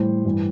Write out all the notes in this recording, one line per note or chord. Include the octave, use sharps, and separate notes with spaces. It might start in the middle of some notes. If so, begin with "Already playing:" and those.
Already playing: A2 E3 G3 C5
G2 E3 G3